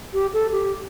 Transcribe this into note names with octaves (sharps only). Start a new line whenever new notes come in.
G4
A4
G4